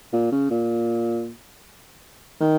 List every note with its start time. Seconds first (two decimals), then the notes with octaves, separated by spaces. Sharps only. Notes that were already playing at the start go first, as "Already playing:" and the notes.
0.13 A#2
0.32 C#3
0.50 A#2
2.41 D#3